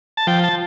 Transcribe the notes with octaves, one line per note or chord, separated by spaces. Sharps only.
A5
F3 G5
A5